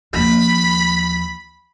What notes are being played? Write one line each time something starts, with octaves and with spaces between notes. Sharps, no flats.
D#2 F3 B5